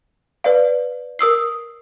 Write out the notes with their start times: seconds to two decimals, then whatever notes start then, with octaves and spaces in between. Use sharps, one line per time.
0.44 B4 D5 F5
1.19 A#4 D#6 E6 C7